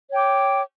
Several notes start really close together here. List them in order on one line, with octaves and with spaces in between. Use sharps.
C#5 G5 D6